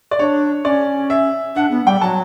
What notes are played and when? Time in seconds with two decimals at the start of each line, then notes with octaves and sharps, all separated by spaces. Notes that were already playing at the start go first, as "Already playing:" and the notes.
0.11 D5
0.19 D4 C#5
0.65 C#4 D5
1.10 E5
1.56 D4 F#5
1.71 B3
1.86 G3 G5
2.01 F#3 A5